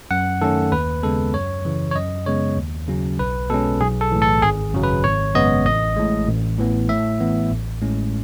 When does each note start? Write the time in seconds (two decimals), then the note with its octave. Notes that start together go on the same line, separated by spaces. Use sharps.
0.11 F#2 F#5
0.41 D#3 A3 C#4 A4
0.72 D#2 B4
1.03 C#3 G#3 B3 A4
1.34 F#2 C#5
1.65 C#3 E3
1.91 C#5
1.96 F#2 D#5
2.26 C#3 G#3 B3 C#5
2.57 D#2
2.88 C#3 F#3 C#4
3.19 B1 B4
3.50 B2 G#3 C#4 A4
3.81 B1 G#4
4.01 A4
4.12 A2 E3
4.22 A4
4.42 G#1 G#4
4.73 F#2 C#3 F#3
4.84 B4
5.04 G#1 C#5
5.35 F#2 C#3 G#3 B3 D#5
5.66 A1 D#5
5.97 A2 G#3
6.28 A1
6.58 A2 E3 B3
6.89 A2 E5
7.20 E3 B3
7.51 A1
7.82 A2 G#3 C#4